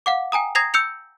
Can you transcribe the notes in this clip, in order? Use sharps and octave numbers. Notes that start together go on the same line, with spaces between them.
F5 F#5 D6
G5 G#5 A#5 D#6
A#5 D#6 G#6 A#6 C7 F7
E6 G6 C#7 F7